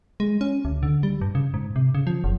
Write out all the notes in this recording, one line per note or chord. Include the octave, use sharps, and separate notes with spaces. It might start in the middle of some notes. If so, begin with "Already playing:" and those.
G#3
C#4
D2
D3
G3
G2
C#3
G#2
C3
C#3
F3
F#1